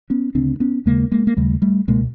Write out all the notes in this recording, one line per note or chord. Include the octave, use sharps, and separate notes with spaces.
B3 C#4
D2 C#3 C4 D4
B3 C#4
D#2 C#3 G#3 A#3
G#3 A#3
A#3
D#2 C#3 G3 A3
G3 A3
C#2 B2 G#3 A#3